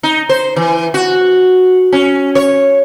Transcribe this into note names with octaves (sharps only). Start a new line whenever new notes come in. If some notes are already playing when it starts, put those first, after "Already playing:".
D#4
C5
E3
F#4
C#4
C#5